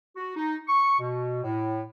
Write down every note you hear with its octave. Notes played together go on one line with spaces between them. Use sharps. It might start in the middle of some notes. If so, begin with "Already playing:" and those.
F#4
D#4
C#6
B2
A2